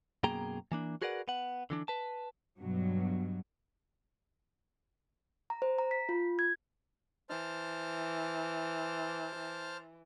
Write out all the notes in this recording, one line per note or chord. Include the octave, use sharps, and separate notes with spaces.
F#2 B2 A#3 G#4 G5 A#5
E3 A#3 D4
F#4 G#4 A#4 B4 D5 F#5
B3 F#5
D3 E3 D4
B4 A5
G2 B2 F#3
A#5
C5
A#5
B6
F4
G#6
E3 C5 A5 F6